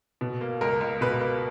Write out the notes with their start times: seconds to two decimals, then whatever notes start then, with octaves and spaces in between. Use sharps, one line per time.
0.21 B2
0.41 A#3
0.61 C#2 A#4
0.81 C#2
1.01 B2 B4
1.20 A#3